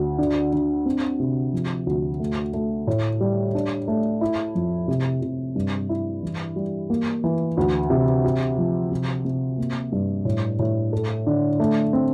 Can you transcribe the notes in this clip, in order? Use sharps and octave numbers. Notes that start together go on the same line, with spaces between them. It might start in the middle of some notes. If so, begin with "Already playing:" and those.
Already playing: D2
D3
D3
C4
C3
F3
D2
A3
A3
A2
G3
D4
A3
E4
F2
C3
C3
G2
E4
E3
G3
A#3
E3
D2
C3
G4
F3
C3
C3
A#3
G2
A2
A2
A4
D3
A3
C4